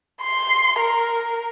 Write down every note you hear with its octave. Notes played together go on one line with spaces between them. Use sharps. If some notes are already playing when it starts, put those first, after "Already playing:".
C6
A#4